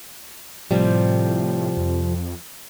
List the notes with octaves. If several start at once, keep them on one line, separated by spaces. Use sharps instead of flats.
A2 C3 F3 G3
F2